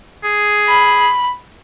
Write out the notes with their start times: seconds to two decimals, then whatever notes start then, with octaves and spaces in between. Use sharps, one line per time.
0.24 G#4
0.68 B5